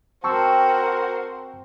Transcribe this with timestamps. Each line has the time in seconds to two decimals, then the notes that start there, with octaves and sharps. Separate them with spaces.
0.24 C4 F#4 A#4 C5 A5 C#6 E6